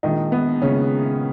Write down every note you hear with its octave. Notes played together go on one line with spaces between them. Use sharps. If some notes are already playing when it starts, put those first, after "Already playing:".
A#1 A#2 D#3 G#3 D#4
B3
A#2 C#3 G#3 C#4